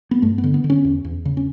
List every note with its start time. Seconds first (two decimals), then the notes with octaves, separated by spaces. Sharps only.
0.11 B3
0.22 G2 A3
0.38 B3
0.44 D3
0.54 B3
0.64 D3
0.70 C#4
0.85 E2
1.05 E2
1.25 C#3
1.37 C#4